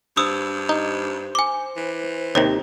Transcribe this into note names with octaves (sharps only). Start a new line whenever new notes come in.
G2 C5 D#6 E6
D#4
G#5 D6
E3
D#2 C3 D#3 C#5